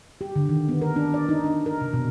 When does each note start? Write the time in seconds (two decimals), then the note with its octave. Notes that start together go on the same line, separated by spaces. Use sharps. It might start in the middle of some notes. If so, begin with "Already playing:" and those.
0.21 G4
0.36 D3
0.49 D#3
0.69 B3
0.81 A#4
0.96 D4
1.14 D5
1.29 D#4
1.44 D4
1.66 A#4
1.81 C3
1.93 B2